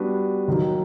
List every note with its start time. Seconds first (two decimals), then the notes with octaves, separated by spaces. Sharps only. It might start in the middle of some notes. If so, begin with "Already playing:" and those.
Already playing: G3 B3 D4 F#4 B4
0.48 D#2 D#3 F#3